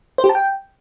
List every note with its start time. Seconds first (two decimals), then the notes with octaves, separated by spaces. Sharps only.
0.18 C5
0.24 G4
0.29 A5
0.35 G5